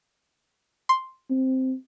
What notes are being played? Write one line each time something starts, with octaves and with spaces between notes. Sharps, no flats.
C6
C4